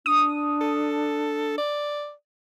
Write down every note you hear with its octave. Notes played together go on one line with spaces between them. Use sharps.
D4 D#6
A4
D5